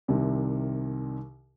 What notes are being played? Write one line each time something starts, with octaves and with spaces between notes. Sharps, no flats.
C2 C3 D#3